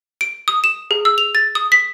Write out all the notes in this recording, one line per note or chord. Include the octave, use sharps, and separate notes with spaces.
D7
D#6
E7
G#4
E6
F7
A6
D#6
B6